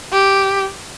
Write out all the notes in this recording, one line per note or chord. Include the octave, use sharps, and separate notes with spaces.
G4